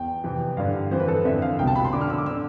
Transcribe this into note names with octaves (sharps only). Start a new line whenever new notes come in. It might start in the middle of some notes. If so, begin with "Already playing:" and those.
Already playing: E2 G5
F2 C3 E3
G2 D3 F5
F2 E3 C5
B4
A4
F2 D3 E5
F5
C2 B2 G5 A5
B5
C6
F2 D3 D6
F6
E6
D6
D3 E6